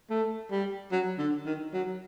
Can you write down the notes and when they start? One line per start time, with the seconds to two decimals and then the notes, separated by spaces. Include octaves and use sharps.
0.10 A3
0.51 G3
0.92 F#3
1.18 D3
1.46 D#3
1.73 F#3